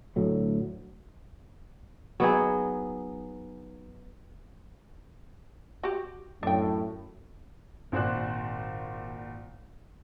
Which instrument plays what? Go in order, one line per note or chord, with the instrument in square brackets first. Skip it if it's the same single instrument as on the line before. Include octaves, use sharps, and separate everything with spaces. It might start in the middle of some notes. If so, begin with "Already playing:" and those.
[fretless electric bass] D2 A2 F#3 A3
[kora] F#3 B3 D#4 G#4
[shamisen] F#4 G4
[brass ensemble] F#2 A2 [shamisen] D4 G5
[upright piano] G#1 A#2 F#4 C5 D5 F#6